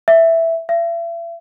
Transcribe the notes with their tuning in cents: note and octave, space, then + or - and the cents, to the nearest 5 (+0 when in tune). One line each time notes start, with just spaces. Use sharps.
E5 +0
E5 +40